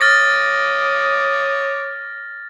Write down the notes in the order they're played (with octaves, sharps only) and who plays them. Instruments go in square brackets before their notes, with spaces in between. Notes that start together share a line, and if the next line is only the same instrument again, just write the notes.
[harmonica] C#5 D6 D#6 [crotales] F6 A6 A#6